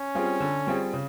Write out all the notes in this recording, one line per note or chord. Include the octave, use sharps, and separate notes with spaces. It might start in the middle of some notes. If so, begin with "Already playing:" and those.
Already playing: C#4
G3 C4 F4 G#4
D3
G3 C4 F4 G#4
C#3